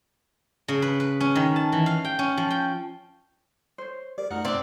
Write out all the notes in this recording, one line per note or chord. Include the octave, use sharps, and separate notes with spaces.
C#3
B4
B4
C#4
D#3
A5
E3
F5
G5
C#4
F3
G5
C5 C#5
G4 A#4 D5
F#2 A3 D#4 F#4 A#4 F#5 F6
C4 D4 D5